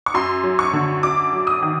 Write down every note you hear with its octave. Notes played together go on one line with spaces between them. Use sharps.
C#6
F#2 C6
F#3
C#6
D3
F#2 D6
F#3
D#6
D#3